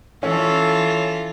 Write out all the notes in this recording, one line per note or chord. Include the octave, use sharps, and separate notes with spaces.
E3 C#4 F4 A4